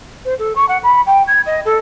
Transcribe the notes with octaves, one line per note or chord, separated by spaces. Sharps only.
C5
A4
C#6
F#5
B5
G5
G#6
D#5
A4